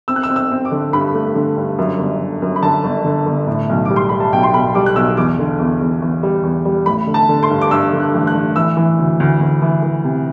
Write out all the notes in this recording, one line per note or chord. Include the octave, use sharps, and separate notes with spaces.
C4 E6
F#6
E6
C4
E6
C4
D6
D3
G2 B5
A3
D3
G2
F#2
G1
D3
F#2
B5
D3 A5
G1
D3
G1
A2
B1
G3 D6
C6
G3 B5
A5
B1 G5
C6
B1 B5
G3 D6
F#6
B1 E6
E2 D6
D3
E2
E2
E2
G3
E2
G3
A1 B5
D3
A5
D3
C6
G2
D6
G2 E6
D3
F#6
A1
F#6
A1
E3 E6
E3
D2
D2
D2
E3
E3
C3